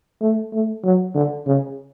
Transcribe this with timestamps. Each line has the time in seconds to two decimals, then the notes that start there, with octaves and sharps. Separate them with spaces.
0.21 A3
0.53 A3
0.84 F#3
1.14 D3
1.46 C#3